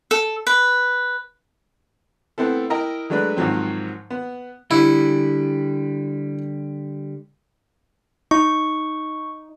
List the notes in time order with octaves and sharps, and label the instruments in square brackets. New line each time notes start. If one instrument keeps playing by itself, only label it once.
[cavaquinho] A4
B4
[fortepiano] A3 B3 C4 E4 A4
E4 A#4 D#5 G5 A#5
F#3 G#3 A3 D4 B4
G#2 D#3 F3 F#3 C4
B3
[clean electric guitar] D3 G3 [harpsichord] E4
[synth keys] D#4 [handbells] C#6